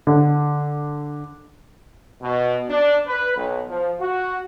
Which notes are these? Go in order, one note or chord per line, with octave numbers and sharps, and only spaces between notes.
D3
B2
D4
B4
B1
F3
F#4